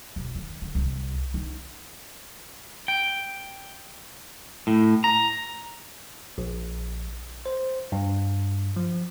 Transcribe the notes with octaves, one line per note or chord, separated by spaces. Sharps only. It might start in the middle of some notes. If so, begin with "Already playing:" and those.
E1
D#3
D3
C2
D#4
G5
A2
A#5
A#1
C5
G2
F3